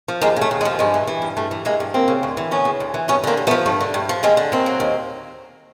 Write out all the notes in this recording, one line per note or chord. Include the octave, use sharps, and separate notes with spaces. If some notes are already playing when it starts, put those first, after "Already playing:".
F3
D#2 G#3 A#3
C#3
A3
D#2
G#3
F3
G2 G#3
E3
E3
G2
G2 A3
E3
E3 G#3 A#3
G2
D2 A#3 C4
C#3
D2
E3
D2 B3 C#4
C#3
D2
E3
G2 B3 C#4
D3 A#3 C4
G2
A3 B3
F3
G2 A3
D3
G2
F3
D#2 G#3 A#3
D3
D#2 A#3 C4
F#3
D#2